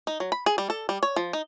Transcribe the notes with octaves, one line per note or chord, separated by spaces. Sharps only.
D#4
F#3
B5
G#4
G3
A4
G3
C#5
F3
D#4